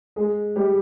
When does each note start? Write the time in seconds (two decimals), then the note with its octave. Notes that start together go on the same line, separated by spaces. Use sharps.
0.16 G#3 G#4
0.56 G3 G4